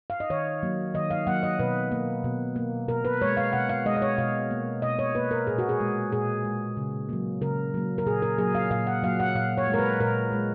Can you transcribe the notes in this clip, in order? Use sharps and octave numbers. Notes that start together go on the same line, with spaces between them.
F5
D#5
D#3 C#5
F#3 A#3
D#3 D#5
F5
F#3 A#3 F#5
D#5
B2 B4
A#3
B2
A#3
B2 A#4
B4
G#3 C#5
F5
B2 F#5
F5
G#3 D#5
D#5
C#5
B2 F5
A#3
B2 D#5
C#5
A#3 B4
A#4
A#2 G#4
F#4
G#4
G#3
A#2 G#4
G#3
C#3
F#3 A#3
C#3 A#4
F#3 A#3
A#4
A#2 G#4
A#4
F#3 A#3 G#4
F5
A#2 F5
F#5
F#3 A#3 F5
F#5
A#2 F5
C#5
G#3
A#4
B4
A#2 A#4
G#3